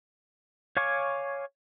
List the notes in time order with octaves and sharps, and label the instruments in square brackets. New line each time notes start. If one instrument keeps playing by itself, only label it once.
[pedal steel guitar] C#5 F5 G#5 C#6 D6